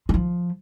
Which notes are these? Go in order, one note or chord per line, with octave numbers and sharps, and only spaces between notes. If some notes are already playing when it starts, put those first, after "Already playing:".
G#3
F3